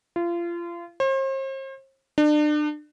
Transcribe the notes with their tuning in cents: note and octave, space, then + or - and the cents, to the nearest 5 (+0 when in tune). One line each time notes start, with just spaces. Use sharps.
F4 -30
C5 +40
D4 +35